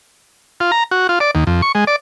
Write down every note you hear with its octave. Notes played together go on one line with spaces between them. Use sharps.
F4
A#5
F#4
F4
D5
D#2
F2
C#6
G#3
D5